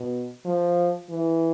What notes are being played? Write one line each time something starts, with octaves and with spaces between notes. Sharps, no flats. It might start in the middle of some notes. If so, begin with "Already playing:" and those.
Already playing: B2
F3
E3